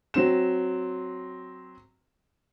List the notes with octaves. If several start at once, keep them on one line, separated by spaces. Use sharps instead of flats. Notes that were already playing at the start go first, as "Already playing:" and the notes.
F#3 C4 E7